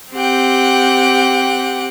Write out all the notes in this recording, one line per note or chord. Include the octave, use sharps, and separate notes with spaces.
C4 G4 F#5 G5